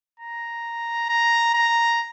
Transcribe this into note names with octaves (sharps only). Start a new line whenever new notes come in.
A#5
A#5
A#5